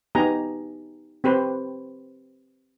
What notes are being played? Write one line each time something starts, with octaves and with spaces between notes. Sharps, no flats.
B3 D#4 G4 G#5 A#5
C4 G4 B4 C5